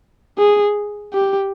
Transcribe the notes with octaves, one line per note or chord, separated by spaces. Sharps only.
G#4
G4